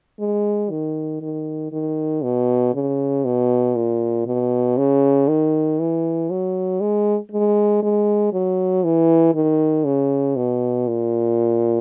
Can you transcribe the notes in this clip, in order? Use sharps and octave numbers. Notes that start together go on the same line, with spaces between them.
G#3
D#3
D#3
D#3
B2
C#3
B2
A#2
B2
C#3
D#3
E3
F#3
G#3
G#3
G#3
F#3
E3
D#3
C#3
B2
A#2